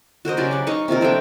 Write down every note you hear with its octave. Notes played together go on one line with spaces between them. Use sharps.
F#4 A#4 C5 D#5
C#3 F#3 G4 D5
D5 F#5
D#4 D#5 F5 C#6
C3 D#4 F4 A#4
F3 A3 D4 G5